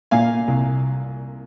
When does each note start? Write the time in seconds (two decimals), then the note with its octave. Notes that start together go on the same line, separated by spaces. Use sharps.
0.11 A#2 F5 G#5
0.48 C2